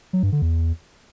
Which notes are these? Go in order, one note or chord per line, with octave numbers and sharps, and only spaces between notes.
F#3
G2
D3
E2